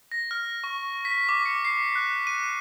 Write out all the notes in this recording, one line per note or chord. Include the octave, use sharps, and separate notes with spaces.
A#6
F6
C#6
B6
D6
C#7
C7
F#6
D#7